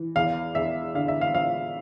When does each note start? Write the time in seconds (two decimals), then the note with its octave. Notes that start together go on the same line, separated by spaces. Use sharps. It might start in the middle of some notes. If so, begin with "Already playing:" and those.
Already playing: E3
0.16 E2 F5
0.55 E2 E5
0.94 D3 F5
1.08 E5
1.21 F5
1.35 F3 F5